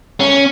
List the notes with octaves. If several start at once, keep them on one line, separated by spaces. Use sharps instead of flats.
C#4